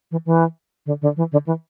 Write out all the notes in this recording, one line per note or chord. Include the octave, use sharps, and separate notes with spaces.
E3
E3
D3
D3
E3
D3
E3